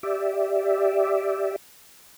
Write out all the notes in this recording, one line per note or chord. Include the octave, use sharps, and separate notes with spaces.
G4 D5 E5